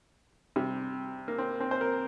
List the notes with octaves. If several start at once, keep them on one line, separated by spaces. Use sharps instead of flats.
C3 G3
A#3
C4
C4
C5
A#4